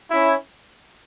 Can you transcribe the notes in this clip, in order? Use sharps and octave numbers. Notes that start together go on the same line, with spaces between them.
C#4 E4